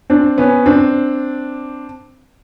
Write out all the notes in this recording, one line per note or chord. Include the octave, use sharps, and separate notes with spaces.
C4 D4
B3 C#4
C4 D4